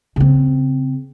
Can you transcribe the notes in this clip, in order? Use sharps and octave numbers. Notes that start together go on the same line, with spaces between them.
C#3 C4